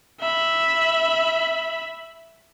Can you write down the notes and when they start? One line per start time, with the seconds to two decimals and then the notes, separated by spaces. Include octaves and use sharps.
0.20 E5 B5